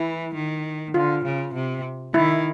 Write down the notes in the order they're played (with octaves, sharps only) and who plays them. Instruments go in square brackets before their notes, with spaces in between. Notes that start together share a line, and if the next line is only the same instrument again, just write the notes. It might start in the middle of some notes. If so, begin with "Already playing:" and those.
Already playing: [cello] E3 [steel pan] E4
[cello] D#3
[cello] D3 [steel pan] F4
[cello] C#3
C3
[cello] D#3 [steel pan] E4